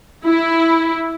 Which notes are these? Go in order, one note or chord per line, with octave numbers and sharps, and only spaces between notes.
E4